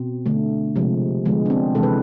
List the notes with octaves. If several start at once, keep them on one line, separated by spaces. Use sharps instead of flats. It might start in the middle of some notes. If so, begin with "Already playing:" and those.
Already playing: B2 C4
D3 A3
C3 F3 G#3
D3 F3 G#3 B3
D4
C4
C3 E3 G#3 A4
B4